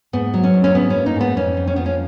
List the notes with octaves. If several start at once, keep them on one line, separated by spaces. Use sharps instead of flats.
G#2 B3
F#3
C#4
G#2
C#4
G#2 B3
C#4
A#3
D#4
G#2 B3
F2 C#4
F2
C#4
F3 B3
C#4